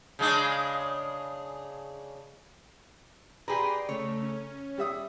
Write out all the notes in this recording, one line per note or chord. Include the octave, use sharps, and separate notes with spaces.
C#3 G#3 D4
G4 G#4 B4 D5 G5 A#5 C6
C#3 A3 C#5
C#4
G3 E5 D#6